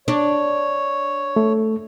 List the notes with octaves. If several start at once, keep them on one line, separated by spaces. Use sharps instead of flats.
D4 C#5
A3